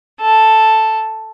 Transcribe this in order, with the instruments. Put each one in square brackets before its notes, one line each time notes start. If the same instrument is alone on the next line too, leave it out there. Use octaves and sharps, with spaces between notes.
[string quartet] A4